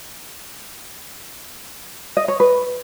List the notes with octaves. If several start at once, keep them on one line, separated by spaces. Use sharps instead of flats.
D#5
C#5
B4